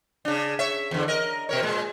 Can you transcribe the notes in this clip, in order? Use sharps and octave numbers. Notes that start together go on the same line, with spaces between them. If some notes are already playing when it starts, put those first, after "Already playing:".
C#3 D4
C#5 E5
E2 D3
A#4 D#5
B2 A#4 C#5
A#2 G#3